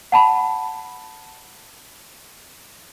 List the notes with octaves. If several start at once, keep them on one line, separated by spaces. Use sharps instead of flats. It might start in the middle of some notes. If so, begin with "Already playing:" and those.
F#5 A5 B5